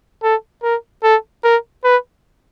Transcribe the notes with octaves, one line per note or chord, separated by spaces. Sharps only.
A4
A#4
A4
A#4
B4